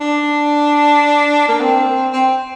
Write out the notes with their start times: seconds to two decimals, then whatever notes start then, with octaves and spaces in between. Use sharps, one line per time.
0.01 D4
1.48 A#3
1.60 C4
2.13 C4